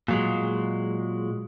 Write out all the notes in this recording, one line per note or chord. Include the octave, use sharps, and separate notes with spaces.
A#2 F#3 G#3